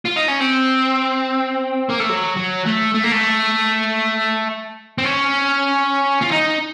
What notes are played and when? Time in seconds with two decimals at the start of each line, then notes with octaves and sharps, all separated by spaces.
0.06 F4
0.17 D#4
0.28 C#4
0.40 C4
1.89 A#3
1.99 A3
2.09 F#3
2.37 F#3
2.66 A3
2.94 A3
3.04 A#3
3.12 A3
4.98 C4
5.04 C#4
6.22 F4
6.32 D#4